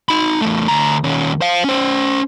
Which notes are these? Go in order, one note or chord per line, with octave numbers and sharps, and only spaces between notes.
D#4 B5
E2 A3
D2 A#5
D#2 C#4
C5 F5
C#4 C5